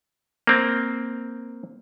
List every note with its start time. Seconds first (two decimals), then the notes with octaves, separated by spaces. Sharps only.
0.47 A#3 C4